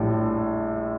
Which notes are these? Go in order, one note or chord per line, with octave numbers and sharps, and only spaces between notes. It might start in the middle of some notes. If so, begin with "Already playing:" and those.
Already playing: A#1 A2 G3